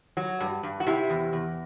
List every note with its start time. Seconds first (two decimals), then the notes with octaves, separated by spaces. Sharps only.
0.17 F#3
0.40 G2
0.63 G2
0.80 F#4
0.87 C3 E4
1.09 E2
1.33 E2